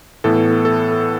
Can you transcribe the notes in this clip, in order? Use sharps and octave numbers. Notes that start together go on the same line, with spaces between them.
A2 E3 B3 A4
A4